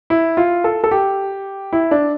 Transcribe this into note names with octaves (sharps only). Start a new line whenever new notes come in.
E4
F4
A4
A4
G4
E4
D4